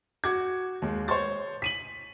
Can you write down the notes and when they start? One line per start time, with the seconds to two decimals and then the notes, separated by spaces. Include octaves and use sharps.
0.24 F#4 D6 G#6
0.82 D#2 G#3
1.08 C5 C#5 C6 C#6 A6
1.62 B6 D#7 F#7